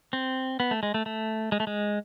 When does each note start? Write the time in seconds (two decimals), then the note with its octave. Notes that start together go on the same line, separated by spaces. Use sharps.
0.13 C4
0.60 B3
0.71 A3
0.83 G#3
0.94 A3
1.06 A3
1.52 G#3
1.60 A3
1.67 G#3